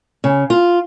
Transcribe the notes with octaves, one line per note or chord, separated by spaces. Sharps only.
C#3
F4